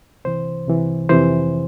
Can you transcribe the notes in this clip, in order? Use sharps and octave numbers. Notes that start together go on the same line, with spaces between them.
C2 C3 E3 C5
C2 C3 E3
F2 C3 E3 C5